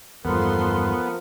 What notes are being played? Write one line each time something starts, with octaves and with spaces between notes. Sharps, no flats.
E2 G2 F3 B3 A4 A#4 C6